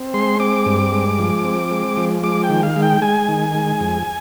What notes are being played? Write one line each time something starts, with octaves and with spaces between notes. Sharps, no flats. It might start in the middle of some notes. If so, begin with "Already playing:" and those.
Already playing: C4
G#3 C6
C4 D6
G2
G#3
F3
C4
G#3
F3
G#3 D6
G5
D#3
F5
G#3
G5
G#3 G#5
D#3
G#3
F2